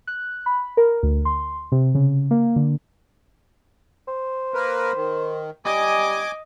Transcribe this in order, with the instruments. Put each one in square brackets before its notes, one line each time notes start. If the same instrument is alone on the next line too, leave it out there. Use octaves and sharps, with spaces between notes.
[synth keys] F#6
B5
A#4
D2
C6
C3
C#3
A#3
D3
[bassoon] C5
[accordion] A#3 A#4 B4
D#3
[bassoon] G3 [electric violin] D#5 [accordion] G#5 D6